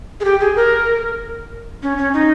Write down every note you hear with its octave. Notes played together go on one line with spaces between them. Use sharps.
G#4
G4
G#4
A#4
C#4
C#4
D#4